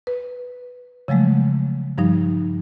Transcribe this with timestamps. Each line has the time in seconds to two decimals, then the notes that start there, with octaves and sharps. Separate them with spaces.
0.07 B4
1.08 C#3 F3 F#3 G#3 A3
1.98 G2 F3 G3 D#4